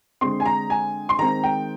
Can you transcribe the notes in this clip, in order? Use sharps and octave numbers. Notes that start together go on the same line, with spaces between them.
D3 G#3 C4 C6
G#5
A#5
G#5
C6
D#3 G#3 C4 A#5
G5